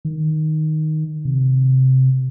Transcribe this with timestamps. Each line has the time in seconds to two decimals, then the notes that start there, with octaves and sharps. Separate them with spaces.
0.05 D#3
1.25 C3